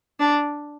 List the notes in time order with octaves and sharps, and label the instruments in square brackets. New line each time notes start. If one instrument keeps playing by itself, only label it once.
[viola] D4